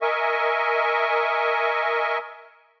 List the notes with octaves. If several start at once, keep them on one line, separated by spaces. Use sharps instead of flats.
A#4 D#5 E5 G#5 C#6